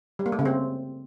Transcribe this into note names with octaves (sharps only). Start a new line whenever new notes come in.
G3
A#3
A3
C#3
C4